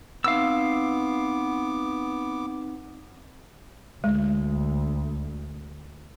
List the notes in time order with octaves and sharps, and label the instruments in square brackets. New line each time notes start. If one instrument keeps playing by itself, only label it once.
[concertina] B3 D6 [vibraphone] C4 D#4 [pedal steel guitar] F5 E6
[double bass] D2 [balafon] G#3